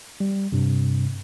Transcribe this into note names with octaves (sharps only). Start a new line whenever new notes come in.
G3
G2 C3